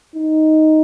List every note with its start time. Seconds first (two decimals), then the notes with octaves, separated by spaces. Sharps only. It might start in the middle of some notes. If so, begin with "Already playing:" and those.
0.16 D#4